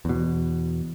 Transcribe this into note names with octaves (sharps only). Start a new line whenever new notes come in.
E2 B2